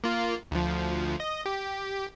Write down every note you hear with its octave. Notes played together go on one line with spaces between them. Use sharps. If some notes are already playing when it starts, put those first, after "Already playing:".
A#3 F4
D2 F3
D#5
G4